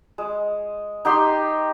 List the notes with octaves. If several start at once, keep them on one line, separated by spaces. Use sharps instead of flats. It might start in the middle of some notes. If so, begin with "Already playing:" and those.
G#3
D#4 G4 G5 C6